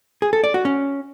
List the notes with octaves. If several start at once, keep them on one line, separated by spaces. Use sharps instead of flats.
G#4
A4
D5
F#4
C#4